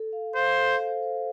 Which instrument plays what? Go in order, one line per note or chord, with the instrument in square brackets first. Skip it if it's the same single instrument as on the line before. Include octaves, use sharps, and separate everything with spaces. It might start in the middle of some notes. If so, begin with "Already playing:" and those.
Already playing: [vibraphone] A4
F5
[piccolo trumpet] C5 [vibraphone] F5
[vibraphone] A4
C5
C5